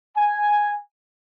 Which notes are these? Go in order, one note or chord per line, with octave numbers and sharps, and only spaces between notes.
G#5